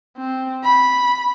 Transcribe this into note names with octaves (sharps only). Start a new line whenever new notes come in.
C4
B5